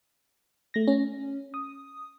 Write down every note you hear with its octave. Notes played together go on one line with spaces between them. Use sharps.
A3 A#6
C#4
D#6